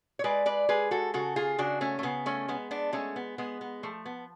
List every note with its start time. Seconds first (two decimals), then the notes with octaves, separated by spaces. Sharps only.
0.19 C#5
0.24 G#3 B4 D5
0.46 B4 D5
0.69 G#3 G#4 B4
0.91 F#4 A4
1.14 C#3 F#4 A4
1.36 F4 G#4
1.58 C#3 D4 F#4
1.81 A3 C#4
1.99 A3
2.03 C#3 B3
2.26 A3 C#4
2.48 G#3 B3
2.71 B3 D4
2.93 G#3 A3 C#4
3.16 B3
3.38 G#3 B3
3.61 B3
3.83 F3 A3
4.06 B3